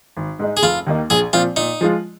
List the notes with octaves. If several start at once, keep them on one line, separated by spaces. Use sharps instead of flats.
G#1
G#2 G#3 D#4
G#4
F1 F4
D#2 D#3 A#3 D#4
A#1 G#4
A#2 F3 C4 F4
A#2 D#4
F3 G#3 F4